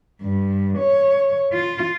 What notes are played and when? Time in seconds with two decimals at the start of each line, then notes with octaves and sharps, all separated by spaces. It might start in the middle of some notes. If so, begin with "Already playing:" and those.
0.22 G2
0.78 C#5
1.54 F4